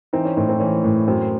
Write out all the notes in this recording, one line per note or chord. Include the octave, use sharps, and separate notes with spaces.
E3 C4 D#4
C#4
A2 C4 D#4
C4 D#4
E3 C#4
A2
F#2 C4